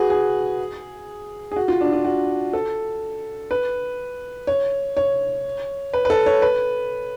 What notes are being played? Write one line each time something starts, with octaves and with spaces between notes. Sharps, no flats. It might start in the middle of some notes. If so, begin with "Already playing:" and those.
Already playing: F#4 G#4 B4
G#4
G#4
F#4
F4
D4
F4
F#4
A4
B4
C#5
C#5
B4
B4
A4
C#5
B4